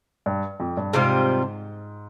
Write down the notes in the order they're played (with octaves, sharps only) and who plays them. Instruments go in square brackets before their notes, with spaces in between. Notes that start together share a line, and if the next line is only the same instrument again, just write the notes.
[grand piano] G2
F2
G2
[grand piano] G#2 [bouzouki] C3 G3 C4 F4